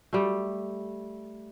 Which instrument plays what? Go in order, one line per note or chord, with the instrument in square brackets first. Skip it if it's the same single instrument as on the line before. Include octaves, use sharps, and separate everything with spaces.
[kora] G3 A3